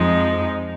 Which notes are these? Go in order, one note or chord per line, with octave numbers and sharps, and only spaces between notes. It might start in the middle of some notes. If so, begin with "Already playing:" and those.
Already playing: F2 F3 G#3 D#4